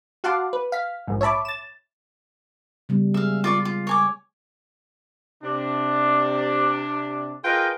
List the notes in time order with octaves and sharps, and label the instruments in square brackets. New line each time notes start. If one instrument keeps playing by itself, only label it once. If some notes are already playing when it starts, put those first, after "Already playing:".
[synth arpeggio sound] F#4 F5 F#5 A5 C6 D6
B4
F5 B6
A#1 G#2
C#5 E5 A5 B5 D6
A6 E7
[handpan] C#3 G3 B3
[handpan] G#3 G#4 [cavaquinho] E5 F5
[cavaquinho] F4 D5 C#6
F4
C#5 G#5 D6
[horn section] C3 D4
F4 G#4 A#4 B4 D#5 G5